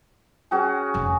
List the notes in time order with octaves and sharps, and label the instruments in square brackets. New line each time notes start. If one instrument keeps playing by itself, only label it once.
[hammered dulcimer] C#4 F#4 G#4
[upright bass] F1 D2